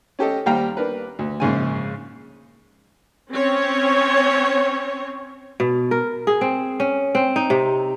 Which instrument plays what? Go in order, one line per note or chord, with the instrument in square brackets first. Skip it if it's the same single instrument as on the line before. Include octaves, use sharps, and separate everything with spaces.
[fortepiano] C#4 G4 A4 D#5
D#2 G3 C5 F5 G5 A#5
D4 A#4 B4
D2
A#1 G#2 C#3 G#5
[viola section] C4 C#4 C#5
[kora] B2
A#4
G#4
C4
C#4
C4
D#4
C3